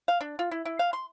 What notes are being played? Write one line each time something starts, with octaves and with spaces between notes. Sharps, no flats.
F5
D4
F4
E4
E4
F5
C6